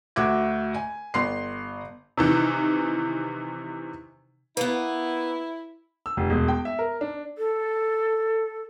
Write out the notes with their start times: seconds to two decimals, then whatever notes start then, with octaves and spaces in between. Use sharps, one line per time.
0.16 D2 F#4 E5 D6 G#6
0.74 G#5
1.14 G1 C6 C7
2.17 C3 D#3 E3
4.57 A#3 B3 E4 B4
6.06 E6
6.17 F1
6.30 E1
6.48 G5
6.65 E5
6.79 A#4
7.01 D4
7.38 A4